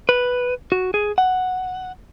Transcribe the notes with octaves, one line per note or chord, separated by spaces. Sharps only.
B4
F#4
G#4
F#5